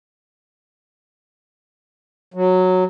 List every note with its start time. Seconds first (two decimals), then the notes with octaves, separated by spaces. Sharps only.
2.34 F#3